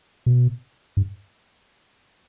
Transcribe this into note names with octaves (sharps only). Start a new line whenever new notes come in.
B2
G2